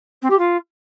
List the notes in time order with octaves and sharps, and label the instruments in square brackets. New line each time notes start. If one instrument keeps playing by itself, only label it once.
[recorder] C4
G4
F4